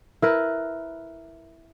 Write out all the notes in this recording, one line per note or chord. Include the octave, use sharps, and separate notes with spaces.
E4 A#4 B4